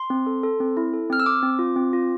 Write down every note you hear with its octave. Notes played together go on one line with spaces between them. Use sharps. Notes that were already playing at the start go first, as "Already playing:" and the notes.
Already playing: C6
C4
A4
A4
C4
E4
A4
C4 F6
E6
C4 D6
C4
F4
C4
F4